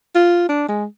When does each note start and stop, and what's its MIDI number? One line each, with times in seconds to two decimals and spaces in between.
0.15 0.47 65
0.49 0.68 62
0.68 0.85 56